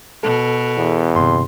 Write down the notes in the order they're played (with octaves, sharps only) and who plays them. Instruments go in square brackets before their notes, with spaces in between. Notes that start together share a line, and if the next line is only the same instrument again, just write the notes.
[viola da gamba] B2 [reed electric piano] A4
[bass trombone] E2
[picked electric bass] G1 C3 [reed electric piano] C6